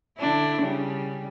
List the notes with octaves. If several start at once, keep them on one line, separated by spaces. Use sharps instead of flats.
D3 D4 E4
C#3 G3